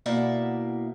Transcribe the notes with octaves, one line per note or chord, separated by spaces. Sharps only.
B2 A#3 E4 D5 E5 F#5